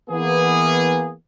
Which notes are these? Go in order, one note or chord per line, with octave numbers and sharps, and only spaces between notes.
E3 A#3 B3 G#4